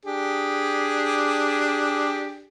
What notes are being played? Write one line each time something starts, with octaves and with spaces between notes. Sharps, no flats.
D4 G4 G#4